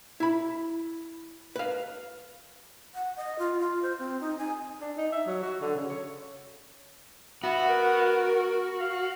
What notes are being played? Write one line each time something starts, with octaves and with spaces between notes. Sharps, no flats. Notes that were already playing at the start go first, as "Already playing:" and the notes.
E4 B5
B4 F5
F#5
D#5
F4
F4
C5
C4
D#4
G#5
D4
D#4
E5
F#3
F#4
D3
C#3
C#5
B3 F#4 E5
A#4
F5